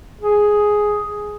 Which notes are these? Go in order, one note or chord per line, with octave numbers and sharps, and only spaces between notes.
G#4